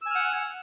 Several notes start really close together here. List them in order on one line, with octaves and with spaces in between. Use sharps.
E6 G#5 F6 F#5